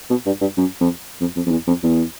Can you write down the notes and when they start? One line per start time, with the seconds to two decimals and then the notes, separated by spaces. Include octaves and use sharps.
0.10 B2
0.26 G2
0.41 G2
0.57 F#2
0.81 F2
1.21 F2
1.36 F2
1.46 F2
1.51 E2
1.67 F2
1.83 E2